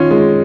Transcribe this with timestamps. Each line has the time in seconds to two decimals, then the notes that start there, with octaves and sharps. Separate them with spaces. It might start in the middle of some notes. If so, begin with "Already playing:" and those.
Already playing: D#3 C#4 F4
0.11 G#3